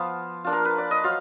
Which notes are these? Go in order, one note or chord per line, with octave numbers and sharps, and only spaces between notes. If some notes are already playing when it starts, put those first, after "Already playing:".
Already playing: F3 B3 F4
A#3 D4 F4
A#4
B4
D5
D#5
F#3 F4 F5